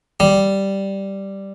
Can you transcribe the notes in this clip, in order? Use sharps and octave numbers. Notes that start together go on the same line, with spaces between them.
G3